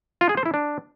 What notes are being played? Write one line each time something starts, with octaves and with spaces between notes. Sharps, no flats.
F4
G#4
C5
E4
D4